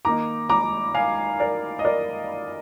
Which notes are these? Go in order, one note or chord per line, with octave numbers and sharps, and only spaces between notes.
D#3 A#3 D#4 A#5 D6
A#5 D6
F5 G#5
A#4 D5
D#5
A#4 D5